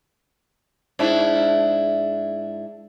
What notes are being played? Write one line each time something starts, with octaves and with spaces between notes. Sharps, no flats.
G#2 D4 E4